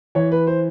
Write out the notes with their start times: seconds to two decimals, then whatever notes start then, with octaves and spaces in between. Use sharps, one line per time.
0.15 E3 C#5
0.32 B4
0.47 C5